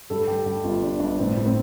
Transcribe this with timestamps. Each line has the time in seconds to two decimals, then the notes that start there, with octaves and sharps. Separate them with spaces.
0.10 G2 A4
0.27 G2 G4
0.46 G2 G4
0.64 G1 F4
0.82 G2 D4
1.00 G1 D4
1.18 A2 C4
1.37 A2
1.46 C4